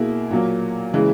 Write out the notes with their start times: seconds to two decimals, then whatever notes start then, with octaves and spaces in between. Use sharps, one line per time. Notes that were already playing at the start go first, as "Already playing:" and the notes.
Already playing: B2 A#3 E4 G#4
0.31 A#2 F#3 A#3
0.93 C#3 E3 G#3